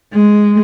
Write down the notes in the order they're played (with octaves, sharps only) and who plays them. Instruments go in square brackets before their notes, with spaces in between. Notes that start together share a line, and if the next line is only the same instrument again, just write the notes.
[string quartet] G#3